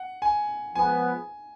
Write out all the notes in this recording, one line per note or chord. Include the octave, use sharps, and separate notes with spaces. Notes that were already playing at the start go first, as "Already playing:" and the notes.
Already playing: F#5
G#5
F3 G#3 B3 G#5